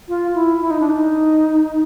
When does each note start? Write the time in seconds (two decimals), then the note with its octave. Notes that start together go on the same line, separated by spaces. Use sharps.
0.09 F4
0.35 E4
0.61 E4
0.71 D#4
0.81 D4
0.90 D#4